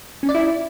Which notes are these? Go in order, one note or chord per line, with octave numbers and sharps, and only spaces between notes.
C#4
D5
E4